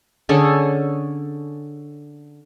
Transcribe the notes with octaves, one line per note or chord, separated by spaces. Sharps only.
D3 C#4 G#4 A4